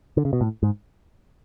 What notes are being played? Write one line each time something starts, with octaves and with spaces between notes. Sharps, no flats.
D3
C#3
B2
A2
G#2